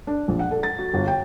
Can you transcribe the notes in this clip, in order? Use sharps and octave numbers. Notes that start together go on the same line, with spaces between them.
D4
A#1
F#5
A4
A6
F#4
G1
G5